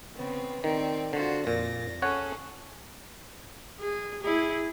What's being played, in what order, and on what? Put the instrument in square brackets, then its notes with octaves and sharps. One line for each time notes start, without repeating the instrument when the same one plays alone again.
[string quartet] C#3 B3 C4
[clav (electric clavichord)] D#3 [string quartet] C4 D5
[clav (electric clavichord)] D3 [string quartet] F4 F#4 C5
[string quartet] F2 A6 A#6 [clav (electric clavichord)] A#2
[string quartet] C#4 G#4 A4 [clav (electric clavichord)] C#5 F#5
[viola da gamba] G#4
E4 G#4